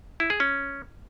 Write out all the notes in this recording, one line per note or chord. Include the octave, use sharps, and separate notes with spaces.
E4
G#4
C#4